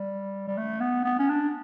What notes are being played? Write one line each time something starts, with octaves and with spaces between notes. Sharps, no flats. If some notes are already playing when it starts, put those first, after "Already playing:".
Already playing: G3
G3
A3
B3
B3
C#4
D4